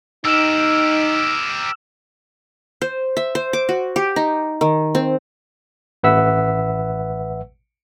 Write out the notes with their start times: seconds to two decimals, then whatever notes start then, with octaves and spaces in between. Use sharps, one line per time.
0.25 D#4 G4 A#4 E6 F6 E7
2.81 C5
3.17 E5
3.35 C5
3.53 D6
3.69 F#4
3.96 G4
4.16 D#4
4.61 D#3
4.95 C4
6.03 A1 B4 E5 F#5 E6 B6